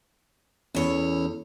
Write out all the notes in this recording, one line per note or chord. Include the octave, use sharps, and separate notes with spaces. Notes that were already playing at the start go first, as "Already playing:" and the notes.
E2 C#4 E4 A4 C#5